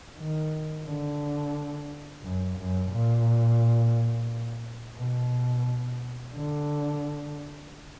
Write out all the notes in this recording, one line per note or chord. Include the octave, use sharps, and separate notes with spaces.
D#3
D3
F#2
F#2
A#2
B2
D3